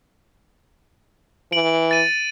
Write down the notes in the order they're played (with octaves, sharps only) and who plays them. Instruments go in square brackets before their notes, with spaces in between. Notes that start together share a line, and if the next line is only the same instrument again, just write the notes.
[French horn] E3 [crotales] D7 F#7
[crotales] A6 D#7